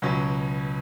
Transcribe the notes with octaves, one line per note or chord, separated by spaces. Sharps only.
C#2 B2 F#3 C#4